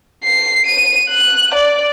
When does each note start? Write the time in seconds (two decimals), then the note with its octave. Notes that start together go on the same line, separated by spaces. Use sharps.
0.25 C7
0.67 D#7
1.10 F#6
1.54 D5